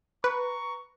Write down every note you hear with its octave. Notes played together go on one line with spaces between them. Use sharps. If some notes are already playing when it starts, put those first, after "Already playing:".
B4 A#5 C#6